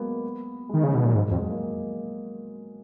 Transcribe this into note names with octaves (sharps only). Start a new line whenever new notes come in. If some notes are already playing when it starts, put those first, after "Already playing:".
Already playing: F#3 G#3 A#3 B3
G#3
D#3
C#3 F3
B2 D#3
A#2 F#3
G#2 G#3
F#3
F2
G#3
A#3